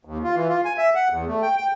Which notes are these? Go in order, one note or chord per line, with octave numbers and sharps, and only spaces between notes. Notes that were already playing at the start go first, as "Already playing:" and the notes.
D#2
F4
E3
F4
G#5
E5
F#5
E2
A3
G5
G5